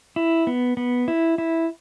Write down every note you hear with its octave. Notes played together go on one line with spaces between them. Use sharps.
E4
B3
B3
E4
E4